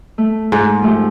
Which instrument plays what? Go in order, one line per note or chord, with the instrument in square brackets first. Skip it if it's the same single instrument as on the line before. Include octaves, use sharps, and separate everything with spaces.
[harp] A3
[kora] G#2
[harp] F3 A3 G4